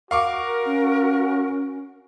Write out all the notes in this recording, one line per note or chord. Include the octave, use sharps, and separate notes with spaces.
F#4 A#4 F5 C#6 D6
C#4